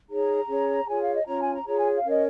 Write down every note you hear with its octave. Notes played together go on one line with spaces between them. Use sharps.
D#4 G#4 C#5 A#5
C#4 G#4 C#5
F4 G#4 C#5 G#5
F5
D#5
C#4 F4 C#5 A#5
G#5
A#5
F4 G#4 C#5 A#5
G#5
F5
C#4 A#4 C#5 D#5